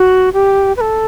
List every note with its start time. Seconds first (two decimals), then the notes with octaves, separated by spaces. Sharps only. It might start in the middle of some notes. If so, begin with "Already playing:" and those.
Already playing: F#4
0.33 G4
0.77 B4
0.81 A4